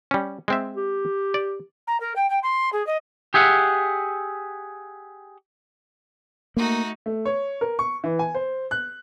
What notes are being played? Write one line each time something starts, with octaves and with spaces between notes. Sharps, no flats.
G3 C#4
G#3 C4 E5
G4
D5
A#5
A#4
G5
G5
C6
G#4
D#5
G4 G#4 E5 F#5
A3 A#3 D#4 F#4
A3
C#5
A#4
C#6
E3
G#5
C5
F#6